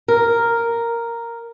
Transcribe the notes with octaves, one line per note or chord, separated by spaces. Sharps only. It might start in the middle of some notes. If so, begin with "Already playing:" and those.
A#4